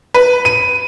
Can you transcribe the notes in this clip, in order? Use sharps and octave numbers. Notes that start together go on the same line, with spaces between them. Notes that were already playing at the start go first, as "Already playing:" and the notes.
B4
D#7